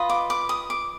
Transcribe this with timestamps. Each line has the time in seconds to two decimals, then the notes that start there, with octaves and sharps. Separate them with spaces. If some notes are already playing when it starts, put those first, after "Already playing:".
Already playing: F4 B4 D#5
0.10 D6
0.30 D6
0.49 D#6
0.70 D6